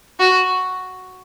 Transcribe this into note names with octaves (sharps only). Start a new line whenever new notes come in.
F#4